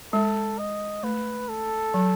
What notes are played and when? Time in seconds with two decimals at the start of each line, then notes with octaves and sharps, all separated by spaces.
0.13 G#3 A4
0.58 D#5
1.03 A3 B4
1.49 A4
1.94 F#3